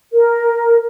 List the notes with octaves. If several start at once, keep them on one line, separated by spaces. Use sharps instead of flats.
A#4